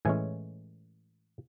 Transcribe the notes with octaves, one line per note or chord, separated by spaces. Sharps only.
A2 E3 G#3 C#4 G#5